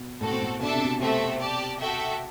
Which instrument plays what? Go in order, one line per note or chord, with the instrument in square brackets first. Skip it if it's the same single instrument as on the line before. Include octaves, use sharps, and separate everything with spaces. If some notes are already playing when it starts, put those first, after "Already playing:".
Already playing: [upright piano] B2
[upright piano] A2 [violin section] C4 F#4 A4
[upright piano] B2
A2
[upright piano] B2 [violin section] D4 A4 E5 A5
[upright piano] C3
B2
[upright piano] C3 [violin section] A3 C4 F#4 A4 E5
[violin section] G4 D5 A5
F#4 A4 E5 G5